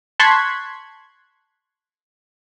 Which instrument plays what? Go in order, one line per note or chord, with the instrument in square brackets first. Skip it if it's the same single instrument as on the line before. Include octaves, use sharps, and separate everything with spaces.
[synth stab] A5 C6 C#6 F#6 G#6 B6